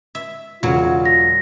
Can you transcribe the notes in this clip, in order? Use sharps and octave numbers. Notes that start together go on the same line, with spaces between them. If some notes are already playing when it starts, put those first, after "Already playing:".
E5
E1 C#3 F#3 F4
A#6